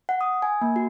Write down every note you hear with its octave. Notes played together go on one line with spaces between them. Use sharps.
F#5
D#6
G#5
A#3
F#4